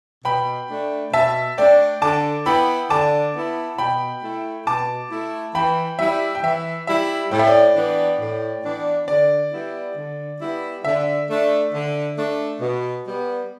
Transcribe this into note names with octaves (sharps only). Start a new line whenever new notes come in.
B2 G5 B5
A3 D4
B2 E5 A5
A3 D4 D5 G5
D3 A5 D6
B3 E4 G5 B5
D3 A5 D6
B3 E4
B2 G5 B5
A3 E4
B2 A5 D6
A3 E4
E3 G5 B5
G3 E4 E5
G5
E3 E5
G3 E4 E5
A2 G5
E5
D5 G5
E3 B3 D4
A2
E3 B3 D4
D3 D5
G3 B3 E4
D3
G3 B3 E4
D3 E5
A3 D4
D3
A3 D4
B2
G3 B3